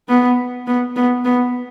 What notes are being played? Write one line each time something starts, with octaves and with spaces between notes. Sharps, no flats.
B3
B3
B3
B3